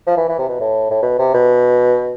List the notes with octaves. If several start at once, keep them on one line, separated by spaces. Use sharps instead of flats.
F3
E3
E3
C3
B2
A2
A2
B2
C3
B2